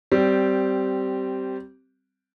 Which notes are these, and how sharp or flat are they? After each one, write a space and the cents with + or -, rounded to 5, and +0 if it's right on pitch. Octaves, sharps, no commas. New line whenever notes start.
G3 -15 C4 -5